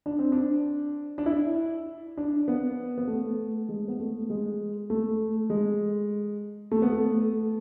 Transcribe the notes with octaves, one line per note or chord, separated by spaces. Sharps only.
D4
C4
D4
D4
E4
D4
B3
B3
A3
G#3
B3
A3
G#3
A3
G#3
A3
B3
A3